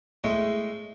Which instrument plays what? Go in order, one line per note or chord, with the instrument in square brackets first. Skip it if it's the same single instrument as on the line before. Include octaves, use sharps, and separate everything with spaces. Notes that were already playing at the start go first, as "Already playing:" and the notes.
[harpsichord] A2 G#3 A3